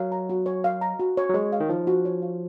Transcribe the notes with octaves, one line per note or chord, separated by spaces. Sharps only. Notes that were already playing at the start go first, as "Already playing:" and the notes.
Already playing: F#3 F5
A#5
F#4
C#5
F5
A#5
F#4
C#5
F#3
G#3 C#5
F5
D#3
F3 D#4
F#4
C#5
F5